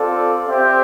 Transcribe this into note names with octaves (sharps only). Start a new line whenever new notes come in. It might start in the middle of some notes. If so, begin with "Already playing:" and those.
Already playing: C4 F4 A4 D5
C4 G4 C5 E5 G5